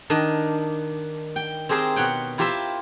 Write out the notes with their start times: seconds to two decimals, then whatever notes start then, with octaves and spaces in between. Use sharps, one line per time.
0.10 D#3 D4 D#5
1.36 G5
1.69 C4 G4 G#4 A#4 C5
1.96 B2 C#5 F#5 G5
2.38 E4 F4 G4 A#4 C5 E5